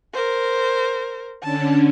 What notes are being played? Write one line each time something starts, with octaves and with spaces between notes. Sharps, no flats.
A#4 C5
D3 C#4 D4 A5